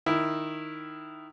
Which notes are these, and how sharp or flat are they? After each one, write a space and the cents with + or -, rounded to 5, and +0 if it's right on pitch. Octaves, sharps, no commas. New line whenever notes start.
D#3 -5 E4 +0